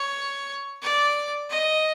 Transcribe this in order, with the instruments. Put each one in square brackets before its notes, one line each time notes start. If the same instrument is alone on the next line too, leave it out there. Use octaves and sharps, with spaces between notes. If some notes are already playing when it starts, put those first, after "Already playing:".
Already playing: [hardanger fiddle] C#5
D5
D#5